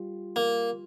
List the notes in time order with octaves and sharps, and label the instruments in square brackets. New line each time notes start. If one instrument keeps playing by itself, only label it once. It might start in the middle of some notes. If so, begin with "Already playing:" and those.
Already playing: [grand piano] G3 F4
[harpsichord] A#3